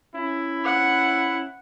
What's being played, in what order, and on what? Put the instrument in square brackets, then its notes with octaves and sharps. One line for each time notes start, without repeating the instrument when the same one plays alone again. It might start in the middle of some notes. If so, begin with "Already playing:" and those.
[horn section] C#4 E4
[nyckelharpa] F#5